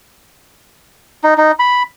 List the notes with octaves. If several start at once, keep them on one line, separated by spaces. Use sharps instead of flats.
D#4
D#4
B5